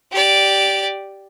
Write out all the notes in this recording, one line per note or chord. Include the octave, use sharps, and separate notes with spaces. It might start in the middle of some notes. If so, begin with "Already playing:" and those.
G4 D5